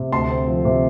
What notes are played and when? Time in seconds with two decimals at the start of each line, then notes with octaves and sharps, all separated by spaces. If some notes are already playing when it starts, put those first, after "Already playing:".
Already playing: C3
0.12 D2 A5 C6
0.29 C4
0.48 F3
0.65 C3